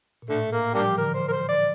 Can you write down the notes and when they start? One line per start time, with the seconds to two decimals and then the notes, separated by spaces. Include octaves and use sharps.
0.22 A#2
0.28 A2 D3 A3
0.52 A#3
0.75 G3 A#3 D4 G4
0.81 F3
0.89 E3
0.97 D3 A#4
1.15 C5
1.28 A#4
1.32 C5
1.49 D5